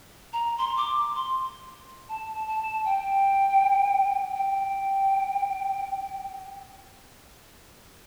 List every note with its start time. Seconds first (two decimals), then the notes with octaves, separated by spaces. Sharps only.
0.33 A#5
0.58 C6
0.77 D6
1.15 C6
2.09 A5
2.47 A5
2.85 G5
4.35 G5